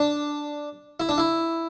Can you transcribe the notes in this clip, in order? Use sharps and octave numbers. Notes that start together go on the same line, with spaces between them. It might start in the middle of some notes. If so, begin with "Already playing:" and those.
Already playing: D4
E4
D4
E4